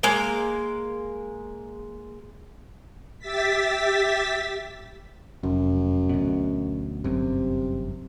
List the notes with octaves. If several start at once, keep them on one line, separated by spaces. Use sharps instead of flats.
G#3 A#3
G4 E5 A6 B6
F1 F#2
D2 B2
G1 F#2 C3